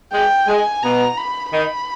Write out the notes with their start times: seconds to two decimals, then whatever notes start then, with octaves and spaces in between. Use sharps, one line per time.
0.13 G#3 G5
0.47 G#3 G#5
0.83 B2 B3 A#5
1.17 B5
1.51 D#3 D#4 B5